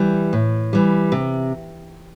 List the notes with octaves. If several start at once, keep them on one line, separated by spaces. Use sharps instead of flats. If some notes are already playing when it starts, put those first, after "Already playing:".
Already playing: E3 G3
A2
E3 G3
C3